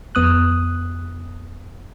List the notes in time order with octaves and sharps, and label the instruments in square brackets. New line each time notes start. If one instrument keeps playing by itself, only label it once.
[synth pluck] F2 B3 D#6 F#6